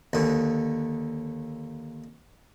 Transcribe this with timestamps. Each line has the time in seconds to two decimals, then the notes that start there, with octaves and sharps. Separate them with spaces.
0.13 D#2 D3